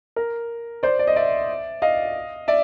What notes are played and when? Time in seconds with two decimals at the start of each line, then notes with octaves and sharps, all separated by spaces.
0.16 A#4
0.83 C5 D5
0.99 D5
1.07 D#5
1.16 D5 E5
1.82 D#5 F5
2.48 D5 E5